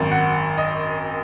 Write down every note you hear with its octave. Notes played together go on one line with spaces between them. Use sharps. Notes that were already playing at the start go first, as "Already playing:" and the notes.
Already playing: G#1 F#2 D#3
F#5
D#5